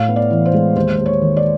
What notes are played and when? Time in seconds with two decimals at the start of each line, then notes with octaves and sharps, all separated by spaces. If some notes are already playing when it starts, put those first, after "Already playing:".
Already playing: A2 F5
0.08 B3
0.16 D5
0.31 E3
0.45 C5
0.53 G#3
0.75 D#2 C5
0.98 D#2
1.06 C#5
1.22 D#3
1.37 D5